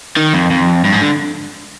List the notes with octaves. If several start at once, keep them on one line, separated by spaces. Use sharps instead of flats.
D#3
F2
F2
G2
G#2
D3